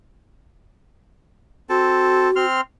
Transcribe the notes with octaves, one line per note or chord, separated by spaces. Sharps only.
C4 F#4 A4
C4 C6 F6